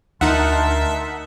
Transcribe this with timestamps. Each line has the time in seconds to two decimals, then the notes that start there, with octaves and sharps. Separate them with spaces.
0.21 D2 D#4 A#4 E5 F#5 A5 C6